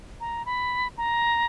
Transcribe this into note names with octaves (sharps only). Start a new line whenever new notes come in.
A#5
B5
A#5